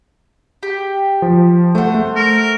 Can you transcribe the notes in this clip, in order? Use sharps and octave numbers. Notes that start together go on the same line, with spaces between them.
G4
F3
A3 C5 F#5
A3
A#4